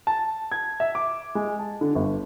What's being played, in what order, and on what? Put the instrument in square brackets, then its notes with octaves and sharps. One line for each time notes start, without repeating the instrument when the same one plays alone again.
[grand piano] A5
G#6
E5
D6
G#3
A5
D3
G1